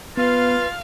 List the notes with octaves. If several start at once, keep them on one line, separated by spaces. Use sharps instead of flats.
B3 F4 B4 F5